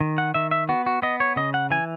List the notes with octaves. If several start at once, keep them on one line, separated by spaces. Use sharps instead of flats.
D#3
F#5
D#3 E5
E5
B3 F#4
F#4
B3 D#5
C#5
C#3 D#5
F#5
E3 G#5